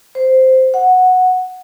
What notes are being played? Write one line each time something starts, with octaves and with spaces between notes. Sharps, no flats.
C5
F#5